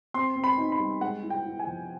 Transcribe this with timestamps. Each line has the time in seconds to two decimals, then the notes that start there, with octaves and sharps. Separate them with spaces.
0.14 C4 C6
0.36 C4
0.44 B5
0.58 D#4
0.72 B5
0.80 G3
1.01 G#3 F#5
1.23 E4
1.30 G5
1.45 E4
1.60 G#5
1.67 F3